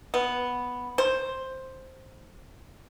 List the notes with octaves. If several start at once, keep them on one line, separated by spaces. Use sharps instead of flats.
B3
C5